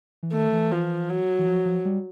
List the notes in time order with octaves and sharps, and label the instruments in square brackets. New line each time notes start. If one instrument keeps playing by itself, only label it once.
[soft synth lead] E3
[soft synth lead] D#3 [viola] A3
[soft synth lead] E3
[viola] F3
F#3
[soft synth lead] E3
F3
F3
G3